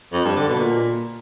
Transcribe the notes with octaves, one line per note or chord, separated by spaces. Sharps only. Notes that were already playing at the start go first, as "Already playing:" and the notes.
F2
G2
D3
B2
A#2